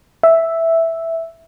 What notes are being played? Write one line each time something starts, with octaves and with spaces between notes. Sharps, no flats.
E5